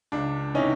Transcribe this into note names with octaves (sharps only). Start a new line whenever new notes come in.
C#2 D4
C3 E3 C#4 D#4